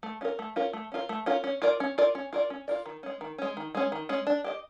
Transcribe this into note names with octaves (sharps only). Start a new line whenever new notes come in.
A3
C#4 F4 A#4
A3
C#4 F4 A#4
A3
C#4 F4 A#4
A3
C#4 F4 A#4
C#4
F4 A#4 D5
C#4
F4 A#4 D5
C#4
F4 A#4 D5
C#4
F4 A#4 D5
D#3
G#3 C#4
D#3
G#3 C#4
D#3
G#3 C#4
D#3
G#3 C#4
D4
G4 C5 D#5